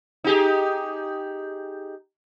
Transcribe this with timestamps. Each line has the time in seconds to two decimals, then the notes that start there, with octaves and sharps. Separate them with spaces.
0.24 D#4 G4 G#4